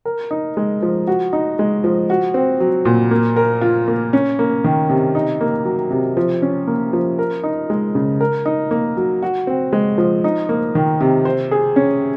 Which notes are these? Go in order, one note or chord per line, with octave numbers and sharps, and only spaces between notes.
A#4
D#4
G#3
F3
F#4
D#4
G#3
F3
F#4
C4
F#3
A#2
A#3
A#4
F4
A#3
C#4
A#3
D#3
C3
D#4
A#3
F#3
C3
F3
C#4
A#3
F3
A#4
D#4
G#3
C#3
A#4
D#4
A#3
F#3
F#4
C4
G#3
F3
D#4
A#3
D#3
C3
C5
G#4
C#4